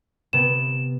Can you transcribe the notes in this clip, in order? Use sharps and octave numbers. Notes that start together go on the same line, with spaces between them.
C3 B3 E7